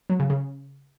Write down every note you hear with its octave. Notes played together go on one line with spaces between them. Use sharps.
F#3
C#3
C#3